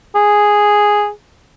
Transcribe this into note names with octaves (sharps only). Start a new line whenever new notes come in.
G#4